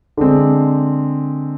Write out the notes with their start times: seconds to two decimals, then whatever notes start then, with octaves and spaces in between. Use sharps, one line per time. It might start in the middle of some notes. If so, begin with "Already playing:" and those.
0.17 D3 G#3 C4